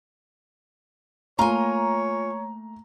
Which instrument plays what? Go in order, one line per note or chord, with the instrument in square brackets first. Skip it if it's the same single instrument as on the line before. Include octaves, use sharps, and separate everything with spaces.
[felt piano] A3 A#3 [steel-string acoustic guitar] F4 G#5 [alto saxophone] C#5 [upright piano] A#5